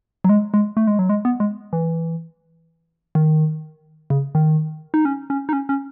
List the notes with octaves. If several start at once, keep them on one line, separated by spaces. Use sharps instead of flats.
F#3
G#3
G#3
A3
G#3
F#3
G#3
B3
G#3
E3
D#3
C#3
D#3
D#4
C#4
C#4
D#4
C#4
C#4